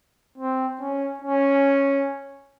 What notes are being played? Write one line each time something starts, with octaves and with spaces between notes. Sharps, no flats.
C4
C#4
C#4